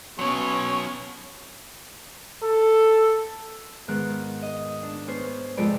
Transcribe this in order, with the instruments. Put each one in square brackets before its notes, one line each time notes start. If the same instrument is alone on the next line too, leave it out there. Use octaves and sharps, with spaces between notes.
[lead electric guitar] B2 F#3 [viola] B3 C#4 [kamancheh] C#5
[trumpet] A4
[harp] G#2 D#3 B3 F#6
D#5
D4
B3 C#4 C5
F2 C3 G#3 D5 B5